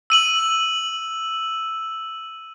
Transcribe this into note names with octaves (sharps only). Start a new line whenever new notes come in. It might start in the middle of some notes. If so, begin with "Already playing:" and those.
E6 D#7 F#7